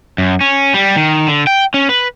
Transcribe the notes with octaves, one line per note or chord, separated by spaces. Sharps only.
F#2
C#4
G3
D#3
D3
G5
C#4
B4